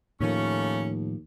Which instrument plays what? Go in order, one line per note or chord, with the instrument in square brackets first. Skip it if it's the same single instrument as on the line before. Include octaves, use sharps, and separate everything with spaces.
[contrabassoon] D#2 [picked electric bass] A2 D#3 F3 [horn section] A3 A#3 C#4